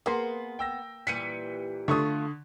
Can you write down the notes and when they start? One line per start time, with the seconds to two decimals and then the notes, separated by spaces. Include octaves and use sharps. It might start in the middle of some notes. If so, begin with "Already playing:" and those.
0.06 A#3 B3 G#4 A#4 C6
0.59 G5 E6 A#6
1.07 A#2 E3 G3 B6 C#7 D#7
1.88 D3 A3 F4 C6 C#6 D#6